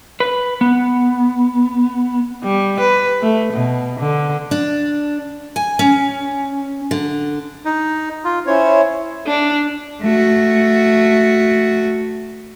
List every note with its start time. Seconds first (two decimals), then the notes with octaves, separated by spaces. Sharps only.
0.20 B4
0.61 B3
2.43 G3
2.80 B4
3.22 A3
3.53 B2
4.00 D3
4.51 D4
5.56 G#5
5.79 C#4
6.91 D3
7.65 D#4
8.25 F4
8.47 C#4 E4 C5 C#5
9.27 D4
10.02 A3 F#4